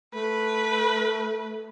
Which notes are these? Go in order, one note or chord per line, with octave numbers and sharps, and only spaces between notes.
A3 B4